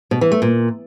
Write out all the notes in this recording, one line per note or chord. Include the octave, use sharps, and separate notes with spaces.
B2
E3
A3
A#2